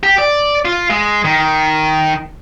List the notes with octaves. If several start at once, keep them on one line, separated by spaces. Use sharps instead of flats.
G4
D5
F4
G#3
D#3